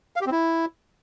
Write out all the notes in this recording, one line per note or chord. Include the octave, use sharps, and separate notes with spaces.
F5
G4
C4
E4